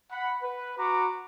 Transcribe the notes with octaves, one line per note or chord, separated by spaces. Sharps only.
F#5 B5
B4
F#4 A#5 B5 D6